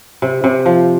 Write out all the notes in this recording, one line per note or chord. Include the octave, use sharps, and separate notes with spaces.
C3
C3
F3